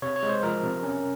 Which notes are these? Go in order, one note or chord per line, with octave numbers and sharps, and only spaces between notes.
C3 C#5
C#5
G#3
C5
F3 A#4
C3
C#4